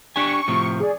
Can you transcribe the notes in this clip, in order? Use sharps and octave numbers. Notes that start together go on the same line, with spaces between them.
D4 G4 G#5 C#6
A2 C3 F3
G#4 D5